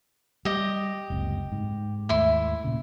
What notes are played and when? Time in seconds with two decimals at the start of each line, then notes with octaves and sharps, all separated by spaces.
0.45 G3 G4 D#5
1.10 F#1 C#2 C3
1.52 G#2
2.09 D#2 G#2 A3 E4 C6
2.64 A#2 C#3